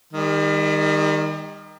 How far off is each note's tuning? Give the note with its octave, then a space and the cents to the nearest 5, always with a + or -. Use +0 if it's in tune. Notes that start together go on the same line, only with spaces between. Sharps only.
D#3 +0 G3 +40